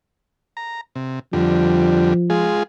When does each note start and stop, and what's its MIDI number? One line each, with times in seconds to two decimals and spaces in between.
0.57 0.81 82
0.95 1.19 48
1.33 2.14 41
1.33 2.14 50
1.33 2.52 53
1.33 2.14 55
2.30 2.63 56
2.30 2.63 65
2.30 2.63 68